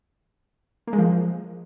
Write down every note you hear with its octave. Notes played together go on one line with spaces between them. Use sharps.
A#3
G#3
F3